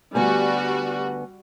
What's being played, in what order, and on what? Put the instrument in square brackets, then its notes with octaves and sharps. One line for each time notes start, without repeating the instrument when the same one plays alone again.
[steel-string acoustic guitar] D2 B3 G#5 [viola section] G3 F#4